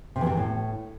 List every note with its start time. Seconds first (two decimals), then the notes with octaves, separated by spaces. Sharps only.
0.16 C3
0.21 E2
0.27 C3
0.32 E2
0.37 A2